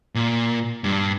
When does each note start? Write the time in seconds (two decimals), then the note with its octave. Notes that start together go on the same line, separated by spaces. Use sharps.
0.15 A#2
0.84 G2